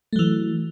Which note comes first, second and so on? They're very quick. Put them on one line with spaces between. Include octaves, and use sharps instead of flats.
A3 F#3 E3